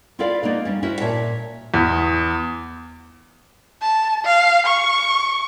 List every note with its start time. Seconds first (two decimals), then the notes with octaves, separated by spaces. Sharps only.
0.19 E4 F4 A4 B4 D5 F5
0.43 A#3 B3 D#4 D5
0.65 G3 C#4
0.83 C#4 E4 F#4 C5
1.00 A#2 C#5 E5 A5
1.74 E2
3.82 A5
4.25 F5
4.66 C#6